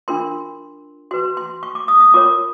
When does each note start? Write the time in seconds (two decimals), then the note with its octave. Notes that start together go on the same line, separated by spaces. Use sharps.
0.08 D4 F4 A#4 C6
1.11 F#4 B4 C6
1.37 C6
1.63 C#6
1.75 D6
1.88 D#6
2.00 D#6
2.14 F4 A#4 C#5 D6